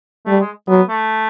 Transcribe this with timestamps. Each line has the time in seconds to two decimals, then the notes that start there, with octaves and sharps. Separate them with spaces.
0.26 G3 A3
0.41 G#3
0.68 F#3 B3
0.89 A3